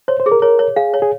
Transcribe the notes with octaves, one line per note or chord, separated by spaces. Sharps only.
C5 C#5
C5
G#4
A#4
A#4 C#5
C#5
G#4 F5
C#5
G#4